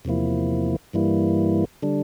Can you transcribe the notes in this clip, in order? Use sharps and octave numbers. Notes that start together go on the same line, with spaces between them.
E2 C3 F3 A#3 E4
G2 E3 G3 A#3 E4
D3 G3 D4